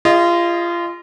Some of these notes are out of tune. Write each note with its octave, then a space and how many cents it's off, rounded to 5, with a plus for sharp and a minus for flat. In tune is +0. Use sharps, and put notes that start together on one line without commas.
F4 -25 G#4 -35 D#5 +0